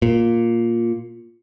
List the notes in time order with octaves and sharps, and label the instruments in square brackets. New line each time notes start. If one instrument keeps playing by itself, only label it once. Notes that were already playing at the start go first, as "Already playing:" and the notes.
[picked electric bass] A#2